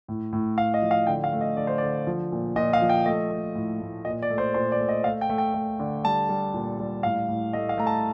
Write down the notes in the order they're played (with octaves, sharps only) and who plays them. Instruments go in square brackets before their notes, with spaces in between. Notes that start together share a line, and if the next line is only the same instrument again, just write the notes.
[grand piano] A2
A2
A2 F5
D#5
F3
F5
D3 G5
F5
A3
D#5
D3 D5
C5
D3 D5
F3
A#2
A#2 D#5
F5
F3
G5
A3 D#5
A3
A2
A2
A#2 D#5
D5
A3
C5
A#2 C5
D5
A3
D#5
A3 F5
G5
A3
G5
A3
D3
G3 A5
G3
A#2
G3
A2 F5
A2
A3 D#5
F5
A3 A#5
A5